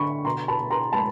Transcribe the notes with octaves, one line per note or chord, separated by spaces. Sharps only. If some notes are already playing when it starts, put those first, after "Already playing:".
Already playing: D3 B5 C#6
B2 A#5 C6
A5 B5
B2
A#5 C6
G#3 A5 B5